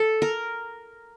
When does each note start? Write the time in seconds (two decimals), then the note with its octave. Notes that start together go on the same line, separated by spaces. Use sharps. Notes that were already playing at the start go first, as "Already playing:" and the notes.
Already playing: A4
0.22 A#4